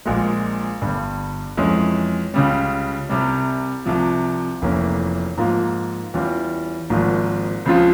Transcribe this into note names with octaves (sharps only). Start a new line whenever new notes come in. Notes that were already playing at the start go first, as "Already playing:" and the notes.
A#1 A#2 G#3
G1 G2 G3
F2 E3 G#3 C#4
C#2 C#3 G3
C2 C3 G3
C2 C3 F3
F1 F2 E3 A#3 C#4
G#2 F3 A#3 F4
E2 E3 G3 C#4 F4
G#1 G#2 F3 A#3
C#2 C#3 F3 C4 F4